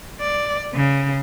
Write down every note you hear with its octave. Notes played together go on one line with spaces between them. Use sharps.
D5
C#3